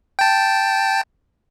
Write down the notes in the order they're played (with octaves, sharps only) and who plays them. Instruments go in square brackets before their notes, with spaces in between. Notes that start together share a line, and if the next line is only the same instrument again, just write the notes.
[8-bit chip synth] G5 A5